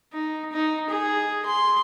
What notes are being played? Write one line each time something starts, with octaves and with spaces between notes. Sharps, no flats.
D#4
D#4
G#4
C6